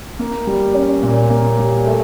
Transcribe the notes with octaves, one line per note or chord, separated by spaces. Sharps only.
A#3
G3
C#4
A#2
A#3
G3
A3